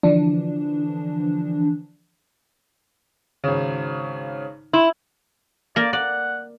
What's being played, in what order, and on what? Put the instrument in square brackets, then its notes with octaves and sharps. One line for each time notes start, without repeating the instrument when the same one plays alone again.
[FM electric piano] D3 E3 F3 D4
[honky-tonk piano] G#1 C#3
[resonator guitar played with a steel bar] E4 [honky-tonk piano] C6
[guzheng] A#3 A#4 [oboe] D5
[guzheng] D5 [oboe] F#5